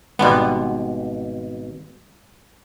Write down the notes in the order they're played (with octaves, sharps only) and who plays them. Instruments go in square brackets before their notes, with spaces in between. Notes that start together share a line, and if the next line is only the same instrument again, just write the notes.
[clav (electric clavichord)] G#1 B2 [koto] G3 G#3 B3